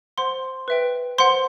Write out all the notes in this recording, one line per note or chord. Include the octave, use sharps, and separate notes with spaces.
C5 F#5 C6
B4 E5 G5
C5 F#5 C6